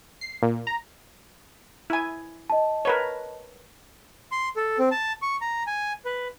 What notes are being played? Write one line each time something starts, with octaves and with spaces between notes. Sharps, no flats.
C7
A#2
A#5
E4 G#5
D#5 A5
A#4 B4 C#5
C6
A4
C4
A5
C#6
A#5
G#5
B4